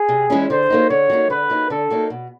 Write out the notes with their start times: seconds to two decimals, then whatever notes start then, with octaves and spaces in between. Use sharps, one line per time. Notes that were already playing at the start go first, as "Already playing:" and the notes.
Already playing: G#4
0.09 C3
0.30 E3 G#3 C#4 E4
0.50 D3 C5
0.70 F#3 A#3 D#4
0.90 D3 C#5
1.10 F#3 A#3 D#4
1.30 D3 B4
1.50 F#3 A#3 D#4
1.70 D3 A4
1.90 F#3 A#3 D#4
2.10 B2